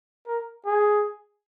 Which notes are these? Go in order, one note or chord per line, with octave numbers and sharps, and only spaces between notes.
A#4
G#4